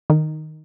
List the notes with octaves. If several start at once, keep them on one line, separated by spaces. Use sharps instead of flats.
D#3